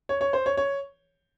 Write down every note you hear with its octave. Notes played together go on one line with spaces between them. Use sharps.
C#5
C#5
C5
C#5
C#5